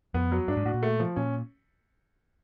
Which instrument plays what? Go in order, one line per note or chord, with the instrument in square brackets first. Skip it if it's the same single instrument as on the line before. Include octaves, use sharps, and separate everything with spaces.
[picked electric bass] F2 [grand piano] B3
[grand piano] F#3
[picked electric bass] G2 [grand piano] D4
[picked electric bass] G#2
[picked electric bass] A2 [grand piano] F#4
[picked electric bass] A#2
[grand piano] A3
F3
[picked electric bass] A#2 [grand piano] C#4